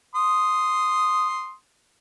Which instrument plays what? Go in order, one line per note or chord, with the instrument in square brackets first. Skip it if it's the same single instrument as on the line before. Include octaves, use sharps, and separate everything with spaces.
[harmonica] C6 D#6